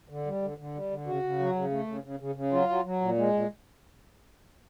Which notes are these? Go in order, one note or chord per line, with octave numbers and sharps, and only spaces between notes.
D3
G3
D3
D3
G3
D3
C#3 F#4
C#3
F#3
C#3
A3
C#3
C#3
C#3
C#3
F#3 F4
F#3
F#3
A#2
G#3
A#2